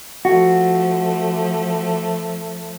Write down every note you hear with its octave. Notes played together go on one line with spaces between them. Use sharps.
F3 A3 F#4